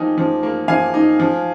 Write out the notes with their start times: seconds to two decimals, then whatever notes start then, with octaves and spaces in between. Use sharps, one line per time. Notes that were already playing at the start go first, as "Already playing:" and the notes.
Already playing: F3 A#3 D#4 G5 G#5
0.18 F3
0.43 A#3
0.68 F3 F5 G#5
0.94 D#4
1.20 F3